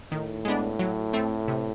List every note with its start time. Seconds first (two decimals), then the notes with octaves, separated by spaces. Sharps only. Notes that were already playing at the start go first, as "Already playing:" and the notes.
0.11 A2 D#3
0.45 G#3 B3 D4
0.79 F#3
1.13 A3 C4
1.48 C3